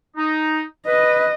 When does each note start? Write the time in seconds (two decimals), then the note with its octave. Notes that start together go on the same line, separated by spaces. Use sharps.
0.17 D#4
0.87 B4 D#5